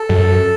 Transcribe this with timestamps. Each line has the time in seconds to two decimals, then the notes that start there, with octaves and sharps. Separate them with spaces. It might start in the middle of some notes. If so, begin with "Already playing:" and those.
Already playing: A4
0.09 F#2